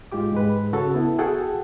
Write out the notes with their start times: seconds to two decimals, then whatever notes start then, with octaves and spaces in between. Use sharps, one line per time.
0.12 G#2 G#3 F4 G4 D6
0.32 G#2 G#3 B4
0.73 C#3 F#4 A4 C#5 A6
0.94 B3 E4 A4
1.19 F#4 G#4 A4 F#5 G5